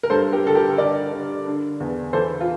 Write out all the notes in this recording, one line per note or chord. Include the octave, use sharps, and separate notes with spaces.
A#4
G2 A4 C5
G4 A#4
D3 A4
G4 A#4
D3 A#4 D5
D3
D3
E2
E3 A4 C5
F4